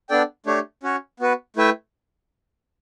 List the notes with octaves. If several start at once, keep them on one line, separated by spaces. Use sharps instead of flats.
B3 D4 A4 D5 G5
A3 D4 G4 C#5
C#4 F#4 C#5
B3 F#4 B4
A3 E4 B4 E5 G5